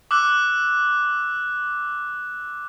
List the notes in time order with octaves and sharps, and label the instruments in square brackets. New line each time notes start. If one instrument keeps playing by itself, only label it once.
[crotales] D6 E6 F#6